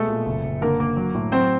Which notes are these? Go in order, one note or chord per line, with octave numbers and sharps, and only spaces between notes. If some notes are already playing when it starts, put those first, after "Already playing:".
Already playing: B2 G#3 A3 A4
A#2
F#1
F#1
D3 A#3 A#4
A#3
F#3
A2
F#3 C4 C5